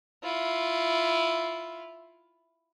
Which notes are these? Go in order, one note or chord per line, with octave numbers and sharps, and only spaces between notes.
E4 F4